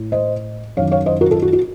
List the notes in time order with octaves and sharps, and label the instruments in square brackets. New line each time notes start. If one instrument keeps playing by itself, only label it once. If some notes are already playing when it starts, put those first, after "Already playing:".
Already playing: [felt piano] A2
C5 D#5
F#2 D#3 C#5 F5
C#5 F5
C5 D#5
F#4 A#4
F4 A4
F#4
F#4